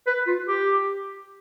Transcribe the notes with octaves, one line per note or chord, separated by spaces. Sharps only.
B4
F4
G4